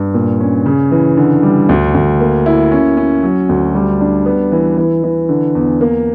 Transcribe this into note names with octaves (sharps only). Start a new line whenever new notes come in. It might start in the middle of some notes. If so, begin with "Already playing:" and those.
Already playing: G2
A#2
C#4
C#3
E3
D3
G3
D2
D2
A#3
E4
C#4
C#4
F#3
D2
G3
D4
B3
E3
E3
E3
D3
E2
A#3